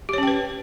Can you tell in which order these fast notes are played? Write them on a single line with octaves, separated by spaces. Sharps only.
G4 C#5 C#4 G5 B4